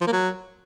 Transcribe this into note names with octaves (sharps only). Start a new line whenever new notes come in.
F3
A#3
F#3